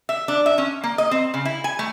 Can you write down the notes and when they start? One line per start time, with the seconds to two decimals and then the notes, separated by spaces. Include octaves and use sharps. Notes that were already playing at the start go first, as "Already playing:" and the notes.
0.09 E5
0.28 D4
0.46 E5
0.58 C#4
0.84 A#3
0.98 D#5
1.11 C4
1.34 C#3
1.45 E4
1.64 G#5
1.79 A3